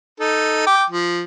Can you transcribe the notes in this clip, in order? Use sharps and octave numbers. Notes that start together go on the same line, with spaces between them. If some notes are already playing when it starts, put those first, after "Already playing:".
D#4 A4
G5 D6
F3